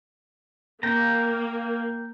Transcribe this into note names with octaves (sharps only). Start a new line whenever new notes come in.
A#3 G5 A#5